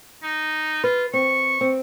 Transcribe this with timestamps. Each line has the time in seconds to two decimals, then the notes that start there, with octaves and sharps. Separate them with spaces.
0.23 D#4
0.84 F4 B4
1.13 C4 C#6
1.61 C4